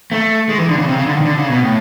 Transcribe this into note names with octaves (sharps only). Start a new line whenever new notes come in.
A3
G#3
E3
D3
C#3
C3
C#3
D3
D#3
C#3
D3
C#3
B2
A2